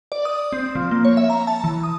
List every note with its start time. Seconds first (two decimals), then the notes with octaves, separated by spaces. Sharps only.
0.12 D5
0.25 D#6
0.52 C4
0.75 F3
0.91 A#3
1.05 C#5
1.17 E5
1.30 A#5
1.47 A5
1.64 E3
1.83 D#6